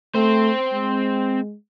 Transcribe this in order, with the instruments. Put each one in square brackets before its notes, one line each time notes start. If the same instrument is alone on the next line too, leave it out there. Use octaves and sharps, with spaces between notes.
[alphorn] A3 [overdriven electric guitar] C4 C5
[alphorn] G#3